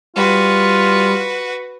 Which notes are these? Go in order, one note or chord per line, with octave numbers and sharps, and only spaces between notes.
G3 F4 F#4 B4